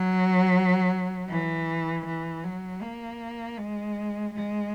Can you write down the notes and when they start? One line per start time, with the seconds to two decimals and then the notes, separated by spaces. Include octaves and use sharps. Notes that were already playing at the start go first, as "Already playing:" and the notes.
Already playing: F#3
1.30 E3
2.06 E3
2.44 F#3
2.83 A#3
3.58 G#3
4.34 G#3